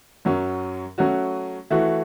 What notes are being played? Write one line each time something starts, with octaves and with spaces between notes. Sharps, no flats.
F#2 F#3 C#4
F#3 A3 C#4 F#4
E3 A3 F#4